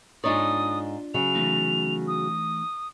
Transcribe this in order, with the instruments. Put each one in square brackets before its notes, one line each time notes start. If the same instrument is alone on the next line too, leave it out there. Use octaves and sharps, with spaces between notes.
[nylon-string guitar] G#2 D#4 C#5 [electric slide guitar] D4 F4 D5 [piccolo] D#6
[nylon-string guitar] C#3 F#3 [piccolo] F7
[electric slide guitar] E3 A3 D#4
[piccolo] D#6